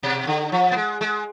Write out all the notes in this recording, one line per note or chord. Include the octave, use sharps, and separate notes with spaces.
B2
D3
F3
B3
G#3
G#3